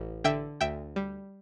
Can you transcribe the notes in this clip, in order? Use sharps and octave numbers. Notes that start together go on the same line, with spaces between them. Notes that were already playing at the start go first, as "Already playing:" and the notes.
Already playing: A1
D3 E5 G5
D2 E5 G5
G3